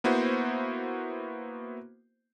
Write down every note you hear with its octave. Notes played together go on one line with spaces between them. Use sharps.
A#3 B3 E4 F#4 C5